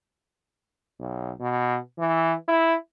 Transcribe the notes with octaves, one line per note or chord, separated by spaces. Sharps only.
B1
B2
E3
E4